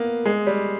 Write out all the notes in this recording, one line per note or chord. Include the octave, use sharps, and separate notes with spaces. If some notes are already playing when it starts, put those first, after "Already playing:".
Already playing: A#3 B3
G#3
G3